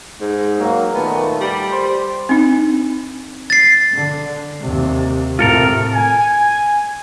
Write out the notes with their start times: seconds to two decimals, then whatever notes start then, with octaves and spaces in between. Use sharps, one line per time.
0.21 G#2
0.59 F#3 A#3
0.92 A#2 D#3 A3 B3
1.40 G3
1.71 C5
2.29 C4 D4 D#4
3.50 A6 C7
3.93 D3
4.61 D#2 C3
5.39 A2 C3 F4 A4 A#4
5.93 G#5